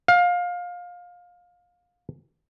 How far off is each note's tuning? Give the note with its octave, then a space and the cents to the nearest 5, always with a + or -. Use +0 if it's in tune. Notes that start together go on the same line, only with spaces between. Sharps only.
F5 +25